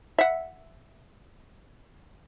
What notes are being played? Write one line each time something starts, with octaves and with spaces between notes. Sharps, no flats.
E5 F#5